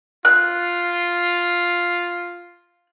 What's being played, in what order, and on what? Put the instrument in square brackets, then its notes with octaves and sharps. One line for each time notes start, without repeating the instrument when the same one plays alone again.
[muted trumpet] F4 [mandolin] F#6